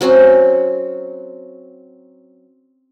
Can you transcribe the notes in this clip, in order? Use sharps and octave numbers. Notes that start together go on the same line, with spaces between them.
F#3 C4 C#4 F#4